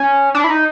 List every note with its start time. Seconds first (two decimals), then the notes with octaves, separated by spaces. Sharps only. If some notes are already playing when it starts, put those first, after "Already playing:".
Already playing: C#4
0.35 D4
0.44 E4
0.50 D#4